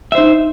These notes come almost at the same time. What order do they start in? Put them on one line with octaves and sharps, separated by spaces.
E5 C5 D#4